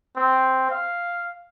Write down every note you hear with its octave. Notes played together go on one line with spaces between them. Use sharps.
C4
F5